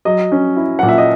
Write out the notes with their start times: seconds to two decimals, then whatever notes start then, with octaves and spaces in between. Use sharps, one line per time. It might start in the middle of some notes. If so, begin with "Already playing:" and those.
0.05 F#3 D#5
0.32 C#4
0.56 E4
0.79 A#2 F#5
0.89 E5
0.98 D#5